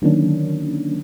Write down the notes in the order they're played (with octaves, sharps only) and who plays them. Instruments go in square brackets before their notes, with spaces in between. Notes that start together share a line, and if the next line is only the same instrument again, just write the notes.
[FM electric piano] D3 D#3 F#3 A#3 C#4 D4